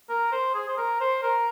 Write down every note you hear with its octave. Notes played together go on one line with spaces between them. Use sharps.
A#4
C5
G#4
C5
A#4
C5
A#4